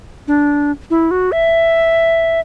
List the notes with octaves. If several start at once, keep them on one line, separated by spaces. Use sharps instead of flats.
D4
E4
F#4
E5